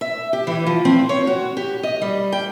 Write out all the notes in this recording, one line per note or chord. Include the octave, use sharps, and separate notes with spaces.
E5
G4
E3
F3
C4
C#5
F#4
G4
D#5
G3
G5